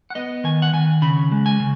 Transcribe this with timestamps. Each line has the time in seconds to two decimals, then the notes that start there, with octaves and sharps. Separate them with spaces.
0.10 F#5
0.15 B3 D#5
0.44 D#3 G#5
0.62 F#5
0.73 D#3 G#5
1.02 C#3 B5
1.31 G#3
1.46 G#5
1.60 C#3